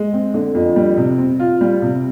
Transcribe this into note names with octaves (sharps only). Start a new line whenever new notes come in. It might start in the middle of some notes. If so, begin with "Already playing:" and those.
Already playing: G#3
C4
D3
F2
G3
C3
C4
F4
G3
C3